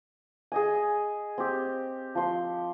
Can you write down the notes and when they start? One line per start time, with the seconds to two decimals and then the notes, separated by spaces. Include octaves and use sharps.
0.52 G#4 D#5 G#5
1.38 C4 G4
2.15 F3 C6